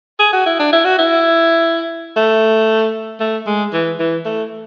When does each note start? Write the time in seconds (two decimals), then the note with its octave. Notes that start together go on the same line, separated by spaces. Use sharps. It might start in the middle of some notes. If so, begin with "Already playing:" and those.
0.19 G#4
0.33 F#4
0.46 E4
0.59 D4
0.73 E4
0.85 F#4
0.98 E4
2.16 A3
3.20 A3
3.46 G#3
3.73 E3
3.99 E3
4.25 A3